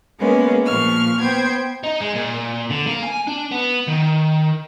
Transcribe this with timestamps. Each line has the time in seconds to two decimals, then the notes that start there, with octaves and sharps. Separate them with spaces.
0.18 G#3 A#3 B3 C#4
0.66 A#2 F3 C#6 F6
1.21 B3 C5 G5 G#6
1.83 D#4
2.01 G#3
2.15 A#2
2.70 D3
2.87 A#3
3.03 G#5
3.27 D4
3.51 B3
3.87 D#3